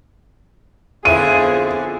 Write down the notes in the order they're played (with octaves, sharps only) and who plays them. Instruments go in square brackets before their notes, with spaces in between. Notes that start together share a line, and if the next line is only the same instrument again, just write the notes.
[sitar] F2 D3 E4 [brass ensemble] B3 F4 [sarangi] G#4 [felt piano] D#7